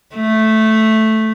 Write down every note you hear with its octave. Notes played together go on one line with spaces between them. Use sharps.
A3